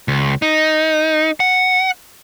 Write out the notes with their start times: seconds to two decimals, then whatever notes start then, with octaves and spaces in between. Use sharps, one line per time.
0.08 C#2
0.42 D#4
1.40 F#5